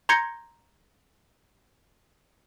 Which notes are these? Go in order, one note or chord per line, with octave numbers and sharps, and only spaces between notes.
A#5 C6 G6 G#6 A#6 C#7